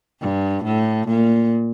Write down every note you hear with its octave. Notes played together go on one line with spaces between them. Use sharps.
G2
A2
A#2